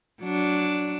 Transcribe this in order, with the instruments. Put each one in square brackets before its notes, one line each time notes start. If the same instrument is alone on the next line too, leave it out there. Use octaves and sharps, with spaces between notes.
[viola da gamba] F#3 D4